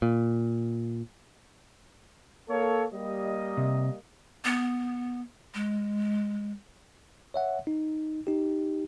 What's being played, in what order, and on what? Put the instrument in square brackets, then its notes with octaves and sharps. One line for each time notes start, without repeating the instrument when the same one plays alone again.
[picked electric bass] A#2
[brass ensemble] A#3 A4 C#5
G3 A#3 D#5
[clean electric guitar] C3
[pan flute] B3
G#3
[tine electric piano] C#5 E5 F#5
D#4
D#4 G4